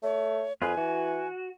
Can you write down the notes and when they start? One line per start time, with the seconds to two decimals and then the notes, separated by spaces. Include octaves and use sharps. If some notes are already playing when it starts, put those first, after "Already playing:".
0.03 A3 C#5
0.62 F2 F4 G#4 B4 G#5
0.77 E3 F#4